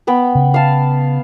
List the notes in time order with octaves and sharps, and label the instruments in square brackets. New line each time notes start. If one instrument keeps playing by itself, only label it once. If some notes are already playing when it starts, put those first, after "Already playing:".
[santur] B3 G5 B5
[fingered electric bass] C#3
[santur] F5 A5